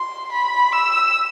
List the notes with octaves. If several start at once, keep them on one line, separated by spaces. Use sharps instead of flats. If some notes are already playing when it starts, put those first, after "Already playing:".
Already playing: C6
B5
E6